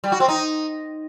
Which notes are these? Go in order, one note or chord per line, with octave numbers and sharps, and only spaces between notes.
G3
F#4
C4
D#4